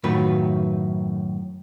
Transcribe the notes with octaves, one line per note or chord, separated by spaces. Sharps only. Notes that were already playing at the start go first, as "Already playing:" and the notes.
F#2 A2 D#3 F4 B4